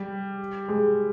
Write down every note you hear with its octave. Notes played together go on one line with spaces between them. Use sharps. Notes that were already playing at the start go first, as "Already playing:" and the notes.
Already playing: G3
G#3